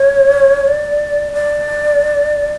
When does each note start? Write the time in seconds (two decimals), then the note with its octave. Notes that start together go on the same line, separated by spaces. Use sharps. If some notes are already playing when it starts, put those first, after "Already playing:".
Already playing: C#5
0.67 D5
1.33 D5